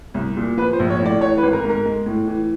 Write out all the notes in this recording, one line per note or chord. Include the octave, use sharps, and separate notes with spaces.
C2
A#2
F3 B4
C5
A#1
C#5
A2
D5
E3 C#5
B4
G#1
A#4
G#2 A#4
G#3
A2
E3